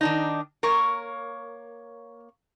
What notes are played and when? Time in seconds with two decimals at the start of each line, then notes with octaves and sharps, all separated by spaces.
0.01 D#3 D4 D#4
0.63 A#3 A#4 C#5 C#6